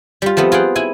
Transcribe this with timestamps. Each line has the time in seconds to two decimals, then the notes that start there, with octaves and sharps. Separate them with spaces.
0.22 G3 F4
0.37 F3 A3 B3 C4
0.52 F4 G#4 F#5 G5
0.76 E4 G#5